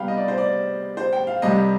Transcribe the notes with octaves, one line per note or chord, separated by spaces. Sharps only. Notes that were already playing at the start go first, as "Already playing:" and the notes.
Already playing: C3 G3 B3 F5 G5
D#5
D5
C5
D5
C5
G5
F5
C2 C3 G3 D#5